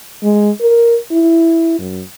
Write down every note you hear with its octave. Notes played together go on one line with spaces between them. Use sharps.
G#3
A#4
E4
F#2